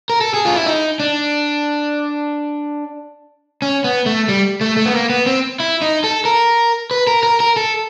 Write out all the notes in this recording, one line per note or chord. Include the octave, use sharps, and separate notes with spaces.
A#4
A4
G#4
F4
E4
D#4
D4
C#4
B3
A3
G3
A3
A3
B3
A#3
B3
C4
E4
D#4
A4
A#4
B4
A#4
A#4
A#4
A4